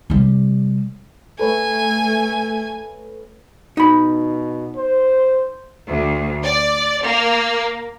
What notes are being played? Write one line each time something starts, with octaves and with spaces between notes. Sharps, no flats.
C3 G3
A3 A4 B4 C#5 G#5
B2 D#4 B5
C5
D2
D5
A#3